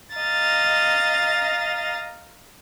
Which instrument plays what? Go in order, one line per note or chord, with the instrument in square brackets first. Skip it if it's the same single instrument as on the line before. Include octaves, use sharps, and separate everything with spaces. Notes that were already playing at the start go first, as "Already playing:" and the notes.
[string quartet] D#5 F5 A#5 A6